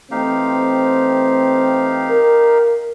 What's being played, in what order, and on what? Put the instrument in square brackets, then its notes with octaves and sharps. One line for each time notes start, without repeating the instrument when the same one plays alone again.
[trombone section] E3 A3 C4 [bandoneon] D#4 G4 F5
[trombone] A#4